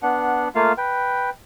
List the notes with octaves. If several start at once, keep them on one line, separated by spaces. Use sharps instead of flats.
B3 D4 F#5
A3 A#3 F4 F5
B4 G5